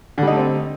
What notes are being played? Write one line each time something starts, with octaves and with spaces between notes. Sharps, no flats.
D3 G3 A3 C4 D#4